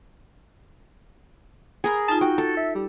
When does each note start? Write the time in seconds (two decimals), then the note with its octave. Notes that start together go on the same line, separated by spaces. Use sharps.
1.84 G#4 A#4 B5 G#6
2.09 D#4 F4 A5
2.21 F#4 G5
2.38 A4
2.57 E5
2.75 G3